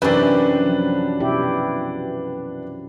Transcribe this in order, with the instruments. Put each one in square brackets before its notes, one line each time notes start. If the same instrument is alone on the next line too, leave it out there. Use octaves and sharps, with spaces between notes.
[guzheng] F#2 C3 [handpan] E3 G4 [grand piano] D4 B4
[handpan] F3 F#3
B2 E4 G4